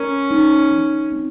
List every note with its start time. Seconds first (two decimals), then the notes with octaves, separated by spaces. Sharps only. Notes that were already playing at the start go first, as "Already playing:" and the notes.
Already playing: C#4 A#4
0.31 D#4
0.71 F3
1.12 C4